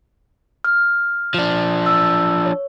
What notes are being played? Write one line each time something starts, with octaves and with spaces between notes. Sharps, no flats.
F6
F3 D4
E6
C#5